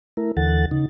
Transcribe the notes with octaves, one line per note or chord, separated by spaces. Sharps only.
A3 E4 A#4
D#2 D3 E3 A4 F#5 A6
C#3 D#4